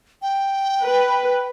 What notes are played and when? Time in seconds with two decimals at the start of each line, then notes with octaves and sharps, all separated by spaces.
0.22 G5
0.82 B4